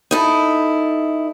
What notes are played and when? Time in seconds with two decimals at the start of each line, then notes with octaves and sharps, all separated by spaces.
0.11 D#4 E4 A4